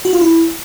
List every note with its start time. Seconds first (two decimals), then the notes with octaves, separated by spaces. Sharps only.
0.05 F#4
0.13 F4
0.21 E4